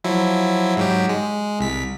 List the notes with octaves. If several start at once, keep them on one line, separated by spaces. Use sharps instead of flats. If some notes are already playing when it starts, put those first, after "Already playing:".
F3 F#3 E4
G#2 F#3 G4
G#3
C2 B6